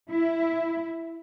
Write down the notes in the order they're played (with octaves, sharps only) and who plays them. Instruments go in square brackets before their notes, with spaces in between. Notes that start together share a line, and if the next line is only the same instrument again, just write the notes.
[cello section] E4